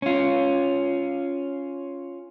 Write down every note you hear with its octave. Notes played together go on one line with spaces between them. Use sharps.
C#4 F4